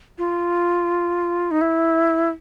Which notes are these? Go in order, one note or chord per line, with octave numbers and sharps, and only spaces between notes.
F4
D#4
E4